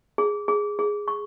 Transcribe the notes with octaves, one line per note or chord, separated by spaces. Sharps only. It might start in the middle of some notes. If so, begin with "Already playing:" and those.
G#4
G#4
G#4
C#6